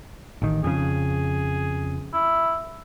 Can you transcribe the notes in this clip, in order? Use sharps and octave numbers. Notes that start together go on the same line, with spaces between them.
A1 D#3
F2 C#3 G#4
E4